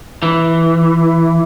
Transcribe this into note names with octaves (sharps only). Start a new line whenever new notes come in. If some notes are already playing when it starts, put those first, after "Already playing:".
E3